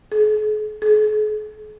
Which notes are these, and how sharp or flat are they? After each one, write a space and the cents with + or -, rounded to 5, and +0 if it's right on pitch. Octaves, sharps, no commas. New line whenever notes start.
G#4 +45
G#4 +45